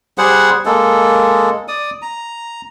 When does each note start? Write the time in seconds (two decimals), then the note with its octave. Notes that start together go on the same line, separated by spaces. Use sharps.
0.18 G3 G#4 C5 F#5
0.66 G#3 A#3 A4
1.68 D5 D#6
2.02 A#5